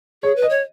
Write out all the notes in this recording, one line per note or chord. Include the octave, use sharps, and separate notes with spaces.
G#4 C#5
B4
D#5
C#5